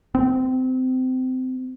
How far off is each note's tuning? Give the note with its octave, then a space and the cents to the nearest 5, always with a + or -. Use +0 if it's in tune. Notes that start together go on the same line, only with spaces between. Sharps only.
C4 -25